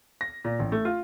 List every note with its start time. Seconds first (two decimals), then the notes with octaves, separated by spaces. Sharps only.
0.21 A#6
0.45 A#2
0.59 A1
0.72 A3
0.85 F4